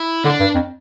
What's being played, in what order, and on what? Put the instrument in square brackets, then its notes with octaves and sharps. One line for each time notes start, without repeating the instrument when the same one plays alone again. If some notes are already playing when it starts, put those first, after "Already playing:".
Already playing: [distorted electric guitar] E4
[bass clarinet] D3 [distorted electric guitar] D4
[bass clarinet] G2
F2